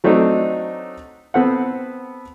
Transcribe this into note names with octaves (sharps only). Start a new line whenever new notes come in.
F#3 A3 C4 D4 D#4
B3 C4 A4 F#5